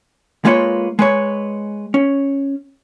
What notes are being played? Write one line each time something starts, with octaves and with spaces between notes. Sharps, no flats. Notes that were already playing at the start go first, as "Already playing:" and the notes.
G#3 A#3 F4 B4 C#5
G#3 B4 C#5
C#4